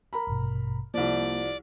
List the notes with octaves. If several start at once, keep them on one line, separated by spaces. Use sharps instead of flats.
A#4 A#5 B5
A1 G2 B2
C2 F3 A#3 D5